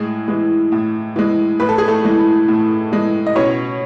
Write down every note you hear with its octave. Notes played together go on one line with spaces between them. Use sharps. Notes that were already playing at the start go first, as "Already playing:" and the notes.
Already playing: A2 G#3 G#4
E3 G#3
A2
E3 G#3
A2 B4
A4
G#4
A3 A4
E3 G#3
A2
E3 G#3
D#5
B2 C#4 C#5